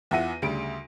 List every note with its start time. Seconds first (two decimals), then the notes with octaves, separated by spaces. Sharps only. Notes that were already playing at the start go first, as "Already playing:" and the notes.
0.11 E2 F4 E5 F#5 A#6 D#7
0.42 D2 C#3 G3 D7